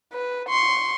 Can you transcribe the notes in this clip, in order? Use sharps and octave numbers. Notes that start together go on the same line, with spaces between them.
B4
C6 C#6